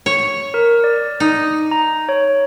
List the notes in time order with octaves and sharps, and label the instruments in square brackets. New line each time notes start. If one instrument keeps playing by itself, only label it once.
[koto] C#5
[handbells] A#4
D5
[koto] D#4
[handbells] A#5
C#5